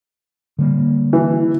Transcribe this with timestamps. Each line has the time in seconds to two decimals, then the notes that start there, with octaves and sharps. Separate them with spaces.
0.59 D3 G3 A#3
1.13 E3